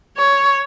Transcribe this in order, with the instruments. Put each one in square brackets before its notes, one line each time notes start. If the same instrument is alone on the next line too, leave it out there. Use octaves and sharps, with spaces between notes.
[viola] C#5